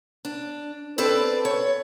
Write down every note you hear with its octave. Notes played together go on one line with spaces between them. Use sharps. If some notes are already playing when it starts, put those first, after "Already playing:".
D4
C4 A4 B4 D5
C#5